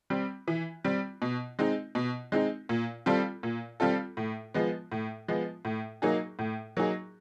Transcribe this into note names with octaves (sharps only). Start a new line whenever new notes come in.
G3 C4
E3
G3 C4
B2
G#3 C4 D#4
B2
G#3 C4 D#4
A#2
G3 C4 F4 A4
A#2
G3 C4 F4 A4
A2
F3 G#3 B3
A2
F3 G#3 B3
A2
F#3 A#3 D#4 G#4
A2
F#3 A#3 D#4 G#4